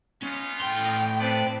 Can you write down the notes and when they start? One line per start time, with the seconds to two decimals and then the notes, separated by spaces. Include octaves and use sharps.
0.23 B3 C#4 D#4 F4
0.61 A2 G5 C6
1.20 B3 C4 B4 D5 A5